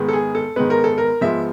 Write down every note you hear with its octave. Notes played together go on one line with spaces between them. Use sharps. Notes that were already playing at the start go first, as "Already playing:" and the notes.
Already playing: G#2 D#3 G#3 B3
A4
G#4
A4
G#2 D#3 G#3 B3 B4
A#4
A4
A#4
G#2 F3 G#3 B3 E5